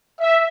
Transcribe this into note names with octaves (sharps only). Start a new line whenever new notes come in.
E5